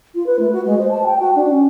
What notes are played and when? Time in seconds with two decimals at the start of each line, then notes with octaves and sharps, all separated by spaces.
0.15 F4
0.26 B4
0.39 A3
0.52 F#4
0.65 G#3
0.78 C5
0.91 A5
1.06 G5
1.19 F#4
1.35 D4
1.49 C#4